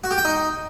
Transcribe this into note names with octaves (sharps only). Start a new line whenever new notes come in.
F#4
G4
G5
D#4